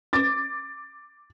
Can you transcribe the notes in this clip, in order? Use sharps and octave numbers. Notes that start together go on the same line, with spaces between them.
D6 A6